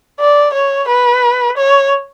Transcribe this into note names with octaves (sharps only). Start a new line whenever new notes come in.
D5
C#5
B4
C#5